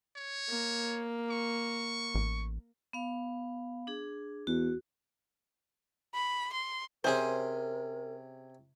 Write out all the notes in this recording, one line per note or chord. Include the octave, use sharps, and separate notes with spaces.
C#5
A#3
C#6
A1
B3 F5
D4 G#4
E2 F#4
B5
C6
C3 C#4 G#4 A#4 C5